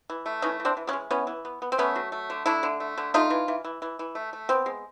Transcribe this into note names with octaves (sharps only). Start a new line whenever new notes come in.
E3
A3
E3 C#4 D#4
E3
C4 D4
E3
B3 C#4
G#3
E3 B3 C#4
E3
B3
B3
C4
A3 B3 C#4
F#3
A3
D3
A3 D4 E4
D3
A3
D3
A3 D#4 F4
E3
E3
E3
E3
E3
A3
A3
B3 C4
G#3